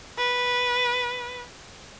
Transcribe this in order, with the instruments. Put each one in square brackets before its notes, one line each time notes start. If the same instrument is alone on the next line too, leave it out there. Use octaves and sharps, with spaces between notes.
[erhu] B4